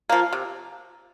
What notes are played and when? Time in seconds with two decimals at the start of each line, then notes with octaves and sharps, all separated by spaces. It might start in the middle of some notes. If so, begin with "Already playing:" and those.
0.09 F3 A#3
0.33 C3